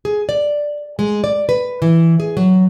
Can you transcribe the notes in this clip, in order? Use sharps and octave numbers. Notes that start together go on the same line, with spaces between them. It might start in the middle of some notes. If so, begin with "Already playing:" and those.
G#4
D5
G#3
D5
B4
E3
G#4
F#3